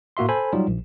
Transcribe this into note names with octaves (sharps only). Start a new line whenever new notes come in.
A2 A#3 F#4 E5 C6
A4 C5 G#5 B5
F#3 G3 D#4 F4
A#1